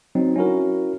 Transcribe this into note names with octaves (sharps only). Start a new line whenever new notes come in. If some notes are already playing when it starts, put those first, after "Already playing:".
F#3 C4 D#4
C#4 E4 F#4 A#4